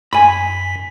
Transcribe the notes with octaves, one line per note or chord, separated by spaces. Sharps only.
F#2 G#5 B5 B6